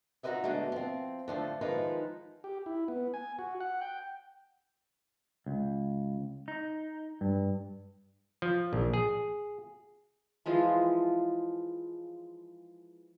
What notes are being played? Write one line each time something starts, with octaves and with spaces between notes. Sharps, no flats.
D#4 F4 F#4 B4 D#5 E5
B2 D3 G#3 A3
F3 C4
D3 F3 A3
D#3 F3 G#3 D#4 F4 B4
G4
E4
B3
G#5
F#4
F#5
G5
C#2
D#4
G2
F3
A#1
G#4
E3 F3 G#3 F4